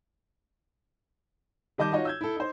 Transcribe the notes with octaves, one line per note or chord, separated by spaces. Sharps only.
D#3 G3 D#5 A5 D6 G6
D#4 F4 F#4 C#5 D#5
E6 G6 G#6
E4 A4
D#4 C5